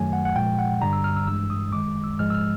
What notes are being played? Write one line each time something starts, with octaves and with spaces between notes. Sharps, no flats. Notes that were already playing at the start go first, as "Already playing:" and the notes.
Already playing: F#2 D#3 F#3 A3 G#5
F#5
F#5
A#2 F3 G#3 G5
F#5
G2 D3 G3 A#5
E6
F6
E6
G2 E3 G#3 E6
D#6
F#2 D#3 G#3 D6
E6
G#2 F3 G#3 F6
E6
F6